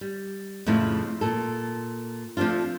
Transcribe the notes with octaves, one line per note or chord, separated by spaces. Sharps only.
G3
F2 A2 C#3 A3 E4
A#2 A4
F3 A3 C4 D4 F4